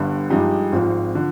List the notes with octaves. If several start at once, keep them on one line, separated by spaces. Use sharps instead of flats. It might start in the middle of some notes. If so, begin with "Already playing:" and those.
Already playing: G1 G2 D3
G2 F3 G#3 D#4 G4
G#1 G#2 F3 C4 F4
D3 F3